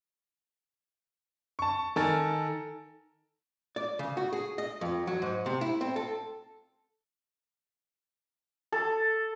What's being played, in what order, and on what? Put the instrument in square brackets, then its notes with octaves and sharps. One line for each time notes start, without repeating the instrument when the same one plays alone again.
[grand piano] A5 C#6
D#3 A4 A#4 G#5 A6
[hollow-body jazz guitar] D5
C#3
F#4
G#4
D#5
F2
F#3
G#2
C3
E4
C4
A4
[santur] A4